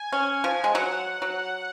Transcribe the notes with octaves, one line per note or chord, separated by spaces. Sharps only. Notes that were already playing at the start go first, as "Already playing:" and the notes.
Already playing: G#5
C#4
F3
G#3
F#3 F#5
F#3